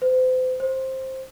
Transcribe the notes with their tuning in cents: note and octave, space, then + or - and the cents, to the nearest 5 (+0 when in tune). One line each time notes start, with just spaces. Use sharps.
C5 -35
C5 +10